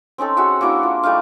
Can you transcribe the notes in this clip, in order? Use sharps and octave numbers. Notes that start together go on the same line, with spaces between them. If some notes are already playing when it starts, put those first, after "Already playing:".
C4 C#4 D#4 A4
F#4 G#4 E5 F#5
A#3 D4 E4 F#4
F4
G3 A3 D#4 F5